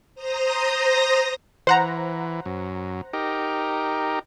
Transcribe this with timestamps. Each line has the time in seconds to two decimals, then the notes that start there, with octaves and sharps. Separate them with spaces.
0.15 C5 A#5 D#6 A#6
1.67 E3 C5 F#5 A#5
2.46 F#2
3.13 D#4 G4 A#4